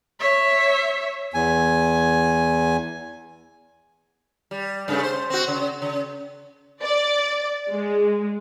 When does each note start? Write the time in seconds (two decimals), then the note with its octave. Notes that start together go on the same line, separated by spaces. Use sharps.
0.20 C#5 E5
1.34 E2 G#5
4.51 G3
4.88 G2 C#3 A3
5.03 C5
5.30 C4 F#4
5.48 C#3
5.82 C#3
6.82 D5
7.70 G#3